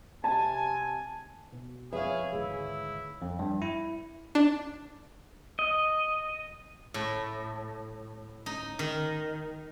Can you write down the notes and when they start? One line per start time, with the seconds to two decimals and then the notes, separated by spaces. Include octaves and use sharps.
0.24 C3 G#5 A5
1.53 B2
1.93 F2 G#4 B4 C#5 E5 F5
2.33 G#1 D2 E4 G#4
3.22 F2
3.39 G2
3.62 E4
4.35 D4
5.59 D#5
6.94 A2
8.46 D#4
8.79 D#3